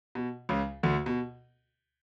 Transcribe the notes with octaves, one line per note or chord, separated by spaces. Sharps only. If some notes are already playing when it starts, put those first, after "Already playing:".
B2
C#2 C#3
D2 D3
B2